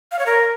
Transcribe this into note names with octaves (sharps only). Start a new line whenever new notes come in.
F5
C#5
A#4